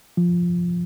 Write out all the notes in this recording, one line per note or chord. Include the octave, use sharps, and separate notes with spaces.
F3